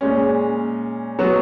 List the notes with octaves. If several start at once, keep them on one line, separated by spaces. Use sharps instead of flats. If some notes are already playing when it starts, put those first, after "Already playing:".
A#2 G#3 C#4
F#3 B3 F#4